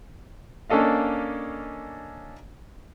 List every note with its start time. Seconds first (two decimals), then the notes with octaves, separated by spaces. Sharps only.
0.70 A#3 C#4 D4 A4 D#5 F5